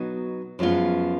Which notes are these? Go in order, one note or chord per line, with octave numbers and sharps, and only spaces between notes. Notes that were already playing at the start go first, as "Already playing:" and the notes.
Already playing: B2 F#3 B3 D#4
F#2 F3 G#3 B3 F4